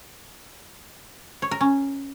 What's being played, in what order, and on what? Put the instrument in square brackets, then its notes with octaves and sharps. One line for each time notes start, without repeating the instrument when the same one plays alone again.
[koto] C#5
A#4
C#4